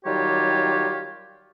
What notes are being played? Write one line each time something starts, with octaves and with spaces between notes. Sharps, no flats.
D#3 F#3 G3 F4 G4 C#5